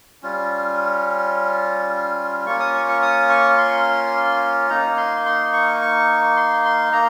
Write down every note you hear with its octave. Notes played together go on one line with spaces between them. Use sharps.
G3 C#4 F4
A#3 C#4 F4 C#6
D#6
C#6
C#6
D#6
C#6
C6
A#3 D#4 A#5
C6
C6
C#6
C#6
C6
C6
A#3 A#5